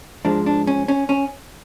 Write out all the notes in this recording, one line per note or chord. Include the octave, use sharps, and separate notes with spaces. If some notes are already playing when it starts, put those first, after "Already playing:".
G#2 F3 G#3 D4
D4
C#4
C#4
C#4